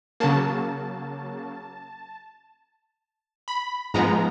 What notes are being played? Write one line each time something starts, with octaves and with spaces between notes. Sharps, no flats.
C#3 F#3 A#3 A5
B5
G#2 F3 G#3 B3 A#5